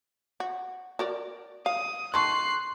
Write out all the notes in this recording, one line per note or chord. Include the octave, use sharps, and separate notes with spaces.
F#4
F#4 A#4 D5
F5 D#6
D#3 A4 C6 C#6 F#6 C7